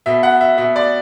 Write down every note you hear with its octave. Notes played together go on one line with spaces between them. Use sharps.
B2 E5
F#5
E5
B2 E5
D5